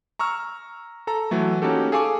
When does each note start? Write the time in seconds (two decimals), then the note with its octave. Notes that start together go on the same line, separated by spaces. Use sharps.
0.19 A#5 C#6 E6 F6
1.07 A4 A#5
1.31 E3 F#3 A3
1.62 A#3 C#4 D#4 F#4 G4 A4
1.92 G#4 A4 F5 G#5 C#6 D6